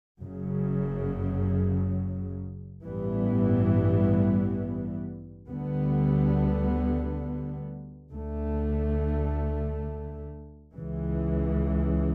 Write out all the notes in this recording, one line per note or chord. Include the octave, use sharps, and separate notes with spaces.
F#1 F#2 C#3 F#3
A1 G2 E3 G3 B3
D2 D3 G3 B3
D2 D3 A3
C#2 C#3 E3